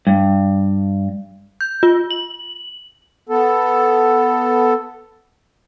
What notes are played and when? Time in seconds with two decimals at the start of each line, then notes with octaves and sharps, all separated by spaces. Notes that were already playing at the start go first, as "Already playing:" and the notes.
0.07 G2
1.61 G6
1.83 F4
2.11 F#7
3.29 B3 A4